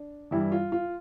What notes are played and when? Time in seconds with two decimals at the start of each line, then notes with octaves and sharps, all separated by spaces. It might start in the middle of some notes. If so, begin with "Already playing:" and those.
Already playing: D4
0.31 G2 E3 G3 E4
0.52 F4
0.72 F4